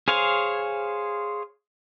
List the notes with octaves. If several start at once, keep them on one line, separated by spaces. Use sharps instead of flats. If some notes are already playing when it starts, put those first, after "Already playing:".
G#4 C5 C#5 F5 G#5